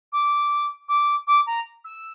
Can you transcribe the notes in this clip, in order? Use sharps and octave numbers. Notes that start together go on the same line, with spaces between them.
D6
D6
D6
A#5
E6